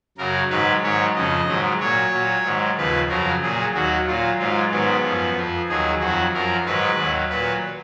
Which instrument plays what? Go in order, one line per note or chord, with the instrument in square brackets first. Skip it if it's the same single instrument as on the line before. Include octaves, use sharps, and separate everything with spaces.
[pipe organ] F#2 C#3 F#3 A#4
G#2 D#3 F#3 B4
G#2 D#3 F#3 C#5
F2 C#3 F3 D#5
G#2 D#3 F#3
A#2 F#3 C#5
A#2 F#3
G#2 D#3 F#3
D#2 C#3 F3 B4
F2 C#3 F#3 A#4
A#2 F#3 G#4
D#2 D#3 F#3 F#4
A#2 F#3 F4
G#2 F#3 F4
G#2 D#3 F#3 B3
F#2 F3
F2 F3
D#2 D#3 F#3 G#4
F2 D#3 F#3 F#4
F#2 F3 A#4
G#2 D#3 F#3 B4
D#2 D#3 F#3
A#2 F#3 B4